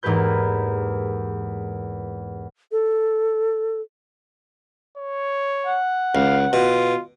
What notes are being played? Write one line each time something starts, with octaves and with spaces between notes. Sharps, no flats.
E2 G#2 A#3 G4 B4 G6
A4
C#5
F#5
C#2 F5
B2 F4